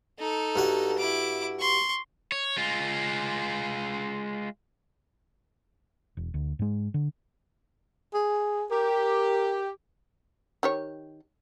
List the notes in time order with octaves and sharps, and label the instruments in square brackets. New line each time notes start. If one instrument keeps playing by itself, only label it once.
[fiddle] D#4 A4
[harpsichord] G2 F#4 F#5
[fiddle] E4 D6
C6 C#6
[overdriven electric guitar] C#5
G#3 F4
[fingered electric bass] E1
D2
G#2 G#3
D3
[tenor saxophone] G#4
[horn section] G4 [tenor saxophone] A#4
[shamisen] D#3 G4 C#5